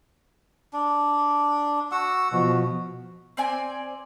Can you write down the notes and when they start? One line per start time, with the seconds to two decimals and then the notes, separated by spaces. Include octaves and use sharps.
0.74 D4
1.92 F#4 F#5 E6
2.32 B2 F3 F#4
3.37 C4 D5 G#5